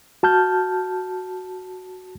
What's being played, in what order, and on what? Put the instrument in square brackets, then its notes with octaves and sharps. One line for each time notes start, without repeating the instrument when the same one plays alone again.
[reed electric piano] F#4 A5 F6 G6